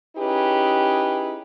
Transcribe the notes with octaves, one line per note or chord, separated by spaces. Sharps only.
C#4 D#4 E4 G4 G#4 B4